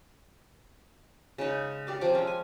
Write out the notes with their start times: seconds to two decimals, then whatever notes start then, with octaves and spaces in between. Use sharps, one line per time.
1.38 C#3 G#3 D#4
1.87 G4 D5 F5
2.01 C3 F3 G3 D6
2.14 G#3 C#4
2.27 G#5